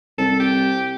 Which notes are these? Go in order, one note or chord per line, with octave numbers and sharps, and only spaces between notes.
C2 A4
G4